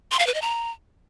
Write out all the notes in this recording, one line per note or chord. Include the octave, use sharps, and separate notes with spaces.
C6
F5
B4
D#5
A#5